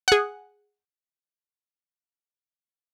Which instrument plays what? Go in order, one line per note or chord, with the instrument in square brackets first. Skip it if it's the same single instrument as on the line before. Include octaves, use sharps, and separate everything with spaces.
[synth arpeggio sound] G#4 F#5